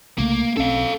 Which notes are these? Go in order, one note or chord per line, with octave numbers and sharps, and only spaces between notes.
C2 C#3 A3 A#3
B1 C4 C#4 A4 F5